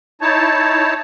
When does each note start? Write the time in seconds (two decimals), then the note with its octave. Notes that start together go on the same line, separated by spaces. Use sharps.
0.21 D#4 E4 C#5 A5